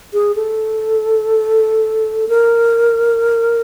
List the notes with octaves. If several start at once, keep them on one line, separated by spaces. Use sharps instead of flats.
G#4
A4
A#4